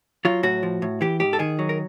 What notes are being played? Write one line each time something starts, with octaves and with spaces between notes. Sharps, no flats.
F#3 F4
A2 F#4
F3
A2
E3 G4
G#2 G4
A4
D#3 G#4
F#3
A#4